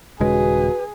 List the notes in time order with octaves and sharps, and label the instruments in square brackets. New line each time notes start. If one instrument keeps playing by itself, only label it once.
[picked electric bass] D#1 C#3 G#3 [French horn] F#4 [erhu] G#4 [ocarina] B4